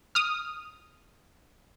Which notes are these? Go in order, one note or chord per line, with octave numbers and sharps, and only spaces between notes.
D#6 F6